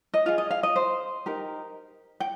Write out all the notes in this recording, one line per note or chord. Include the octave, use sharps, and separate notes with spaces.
D#5
F4 G#4 F5
D#5
F5
D#5
C5
D#4 G4 A#4
G5